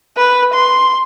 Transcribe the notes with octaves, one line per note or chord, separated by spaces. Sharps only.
B4
C6